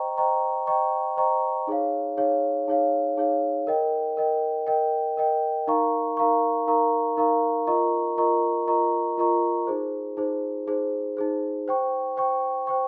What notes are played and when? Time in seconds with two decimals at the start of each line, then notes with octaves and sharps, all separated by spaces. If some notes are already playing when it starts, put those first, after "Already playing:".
Already playing: C5 D#5 G5 A#5 C#6
0.17 C5 D#5 G5 A#5 C#6
0.67 C5 D#5 G5 A#5 C#6
1.17 C5 D#5 G5 A#5 C#6
1.67 D#4 G#4 C#5 F5
2.17 D#4 G#4 C#5 F5
2.68 D#4 G#4 C#5 F5
3.17 D#4 G#4 C#5 F5
3.67 A#4 D#5 G5
4.17 A#4 D#5 G5
4.67 A#4 D#5 G5
5.17 A#4 D#5 G5
5.67 D#4 A#4 F5 A#5 C#6
6.17 D#4 A#4 F5 A#5 C#6
6.67 D#4 A#4 F5 A#5 C#6
7.17 D#4 A#4 F5 A#5 C#6
7.67 F4 A#4 D#5 A#5 C#6
8.17 F4 A#4 D#5 A#5 C#6
8.67 F4 A#4 D#5 A#5 C#6
9.18 F4 A#4 D#5 A#5 C#6
9.67 D#4 G#4 C5
10.17 D#4 G#4 C5
10.67 D#4 G#4 C5
11.17 D#4 G#4 C5
11.68 C5 G5 C#6
12.17 C5 G5 C#6
12.67 C5 G5 C#6